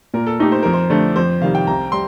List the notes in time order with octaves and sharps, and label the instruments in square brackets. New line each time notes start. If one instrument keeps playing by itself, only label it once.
[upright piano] A#2 [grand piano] A#4
[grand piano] A4
[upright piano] A3 D#4 G4
[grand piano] C5
[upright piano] F2 [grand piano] A#4
[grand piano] C5
[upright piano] D3 A3
[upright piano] F2 [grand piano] C5
[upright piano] C3 D#3 G3 [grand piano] F5
[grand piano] G5
[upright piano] C2 [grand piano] A#5
[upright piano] G3 [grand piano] C6